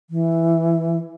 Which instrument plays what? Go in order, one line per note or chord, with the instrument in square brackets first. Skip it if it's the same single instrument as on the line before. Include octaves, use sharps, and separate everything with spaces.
[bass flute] E3